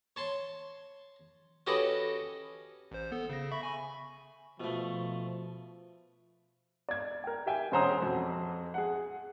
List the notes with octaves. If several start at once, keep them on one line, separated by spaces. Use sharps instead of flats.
C#5 A5 C6
C#4 F#4 G4 A4 B4 D#5
A1 C5
B3 A4
C#3 A#6
E5 B5 C#6
G#5 B5 C#6
B2 F3 A3
D5 G#6
A#4 G5
G4 E5 G5 G#5
E1 C#4 C5 F#5 A#5 D#6
F2 C4 F#4
G#4 F#5